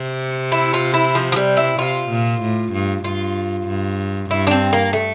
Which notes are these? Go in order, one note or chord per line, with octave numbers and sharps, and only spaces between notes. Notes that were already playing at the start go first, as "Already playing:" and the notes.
Already playing: C3
E4
F4
E4
F3
F3
G3
E4
C3 F4
A#2
A2
G2
G2 F4
G2
G2 E4
D4
C4
A#3
A3